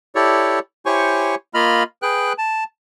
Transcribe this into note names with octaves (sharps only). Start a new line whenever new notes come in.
E4 G4 A4 C#5 D5
E4 G4 C5 C#5 G#5 C#6
A#3 F4 D#5 B5 F6
G#4 B4 G5 F#6
A5